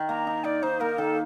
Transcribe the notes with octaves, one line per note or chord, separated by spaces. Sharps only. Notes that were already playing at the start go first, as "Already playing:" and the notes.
Already playing: D#3 D#4
A#3 A#5
D#4
D#4 D5
D#4 C5
A#3 A#4
D#3 A4